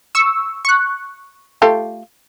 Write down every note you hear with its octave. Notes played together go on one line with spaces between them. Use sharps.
C#6 E6
C#6 F#6
A3 F4 G4